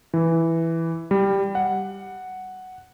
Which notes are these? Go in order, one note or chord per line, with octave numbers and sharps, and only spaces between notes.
E3
G3
F#5